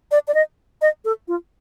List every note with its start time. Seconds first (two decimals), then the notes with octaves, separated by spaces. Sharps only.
0.11 D5
0.28 D5
0.34 D#5
0.82 D#5
1.05 A4
1.28 F4